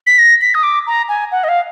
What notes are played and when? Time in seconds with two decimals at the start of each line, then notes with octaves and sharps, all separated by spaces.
0.07 B6
0.18 A#6
0.41 B6
0.54 D#6
0.63 D6
0.87 A#5
1.09 G#5
1.32 F#5
1.44 D#5
1.49 F5